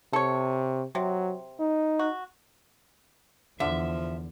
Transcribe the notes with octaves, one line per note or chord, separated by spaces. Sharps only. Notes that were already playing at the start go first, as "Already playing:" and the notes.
C3 A4 C#5
C3 F#3
D#4
F#4
E2 D3 F3 E5